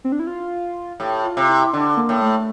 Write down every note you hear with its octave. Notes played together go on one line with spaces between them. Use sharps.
C4
D4
E4
F4
A2 G4
F4
C3
E4
D3 D4
A#3
A2
A3